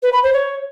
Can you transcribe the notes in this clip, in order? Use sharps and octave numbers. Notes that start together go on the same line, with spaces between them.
B4
B5
C5
C#5